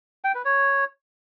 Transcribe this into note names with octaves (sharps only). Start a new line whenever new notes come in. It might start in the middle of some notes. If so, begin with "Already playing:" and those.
G5
B4
C#5